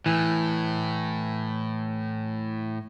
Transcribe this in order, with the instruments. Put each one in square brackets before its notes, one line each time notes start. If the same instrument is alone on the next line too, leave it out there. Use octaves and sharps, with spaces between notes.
[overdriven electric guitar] A2 [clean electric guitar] E3